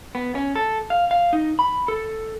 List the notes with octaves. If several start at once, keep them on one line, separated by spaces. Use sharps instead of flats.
B3
C#4
A4
F5
F5
D#4
B5
A4